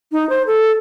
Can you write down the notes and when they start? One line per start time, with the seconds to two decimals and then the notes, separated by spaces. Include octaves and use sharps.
0.12 D#4
0.29 C5
0.47 A4